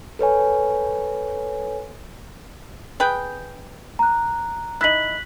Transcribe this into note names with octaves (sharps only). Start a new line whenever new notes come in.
A4 B4 C#5 G#5
G#4 B4 G5
A#5 F#6
D#4 E4 F#6 B6 F#7